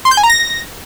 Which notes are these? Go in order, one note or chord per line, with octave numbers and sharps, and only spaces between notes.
C6
G6
G#5
A#5
A#6